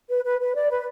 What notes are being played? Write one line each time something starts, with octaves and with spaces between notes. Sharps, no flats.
B4
B4
B4
D5
B4